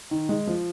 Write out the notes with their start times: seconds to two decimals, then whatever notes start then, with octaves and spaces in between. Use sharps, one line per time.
0.11 D#3
0.29 G#3
0.47 F3